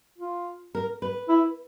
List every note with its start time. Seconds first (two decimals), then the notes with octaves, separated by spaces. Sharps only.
0.19 F4
0.75 A#4
1.02 B4
1.29 E4